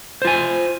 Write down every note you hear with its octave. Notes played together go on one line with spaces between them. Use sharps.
F4 C5 G#5